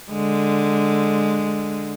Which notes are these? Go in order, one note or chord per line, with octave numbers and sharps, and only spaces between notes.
D3 G#3